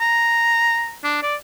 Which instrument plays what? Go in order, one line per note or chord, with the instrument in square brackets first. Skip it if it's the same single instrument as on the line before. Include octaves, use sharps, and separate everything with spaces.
[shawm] A#5
D4
D5